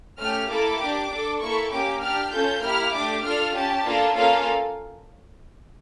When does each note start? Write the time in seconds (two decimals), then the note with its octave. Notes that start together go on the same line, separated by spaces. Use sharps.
0.19 A3 C#4 G4 F6
0.49 A#3 E4 A4 D6
0.79 D4 G4
1.10 D4 A4
1.41 A#3 E4 A4 C#6
1.71 A#3 C#4 G4 D6
2.01 D4 G4 F6
2.32 C#4 F4 A4 G6
2.62 A#3 E4 G4 F6
2.93 A3 D4 G4 D6
3.24 D4 F4 A4 F6
3.54 C#4 G4 A5
3.85 A#3 D4 F4 A4
4.15 A#3 C#4 F4 A4 F5